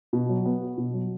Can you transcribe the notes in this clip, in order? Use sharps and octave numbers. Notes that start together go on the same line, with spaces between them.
B2
F#3
B3
F#4
B2
F#3